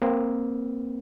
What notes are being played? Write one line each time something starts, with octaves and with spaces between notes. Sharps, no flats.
A#3 C4